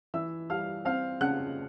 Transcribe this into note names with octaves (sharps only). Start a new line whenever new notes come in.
E3 E5 E6
G3 F5 F6
C4 F5 F6
C#3 F#5 F#6